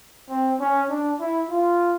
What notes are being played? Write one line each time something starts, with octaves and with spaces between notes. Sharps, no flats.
C4
C#4
D4
E4
F4